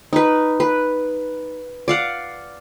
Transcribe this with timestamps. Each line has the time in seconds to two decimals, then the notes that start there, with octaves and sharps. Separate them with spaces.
0.13 D#4 B4
0.60 B4
1.88 D5 F5 F#5